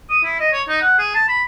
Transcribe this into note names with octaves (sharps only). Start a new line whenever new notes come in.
D#6
E4
D#5
C#5
D#4
F#5
G#4
A5
B5